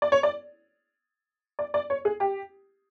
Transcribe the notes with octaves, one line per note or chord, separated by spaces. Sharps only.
D5
C#5
D5
D5
D5
C#5
G#4
G4